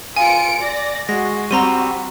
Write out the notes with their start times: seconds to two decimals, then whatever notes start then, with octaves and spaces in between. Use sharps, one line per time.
0.17 F4 G#5 C#7 D7
0.59 D5 A#6
1.09 G#3 F#4 A#6
1.51 G3 C4 A#5 C6 D#7